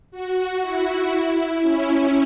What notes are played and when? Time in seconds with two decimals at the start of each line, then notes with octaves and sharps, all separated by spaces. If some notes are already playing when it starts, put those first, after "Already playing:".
0.11 F#4
0.61 E4
1.61 C#4